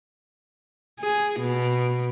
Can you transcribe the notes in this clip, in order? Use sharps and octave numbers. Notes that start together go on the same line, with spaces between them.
G#4
B2